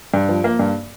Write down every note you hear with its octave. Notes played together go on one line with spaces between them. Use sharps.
G2
F3
A#3
G2